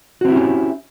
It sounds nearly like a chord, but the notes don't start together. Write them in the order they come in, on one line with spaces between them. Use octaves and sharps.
F#4 C4 E4 G4 C#4